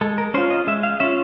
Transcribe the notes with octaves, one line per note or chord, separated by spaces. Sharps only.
G#3 A4
A#4
C#4 F4 C5
D#5
G#3 E5
F5
C#4 F4 E5